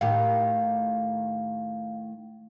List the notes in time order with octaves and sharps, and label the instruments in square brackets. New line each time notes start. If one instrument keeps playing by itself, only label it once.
[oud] A2 D#3 G4 [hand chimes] F5